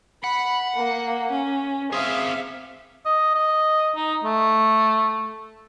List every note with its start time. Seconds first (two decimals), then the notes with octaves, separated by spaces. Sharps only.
0.24 F#5 B5
0.76 A#3
1.31 C#4
1.92 C4 G#4 E5 F5
3.06 D#5
3.35 D#5
3.96 D#4
4.24 A3